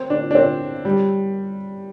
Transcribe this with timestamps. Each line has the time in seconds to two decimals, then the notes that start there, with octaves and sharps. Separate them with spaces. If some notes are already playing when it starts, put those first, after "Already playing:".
Already playing: C4
0.10 D4
0.31 D4
0.35 C4
0.85 G3